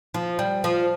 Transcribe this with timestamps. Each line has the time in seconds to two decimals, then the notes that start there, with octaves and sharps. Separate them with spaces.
0.14 F3
0.39 G3
0.64 F3